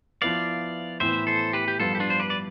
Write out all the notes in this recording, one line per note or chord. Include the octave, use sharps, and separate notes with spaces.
F3 B3 E4 B4 D5 F5
A2 E3 B3 C5 E5
A4 C5
G4 B4
G4
G2 F3 B3 F4 A4
G4
D4 F4
C5
B4 D5
D5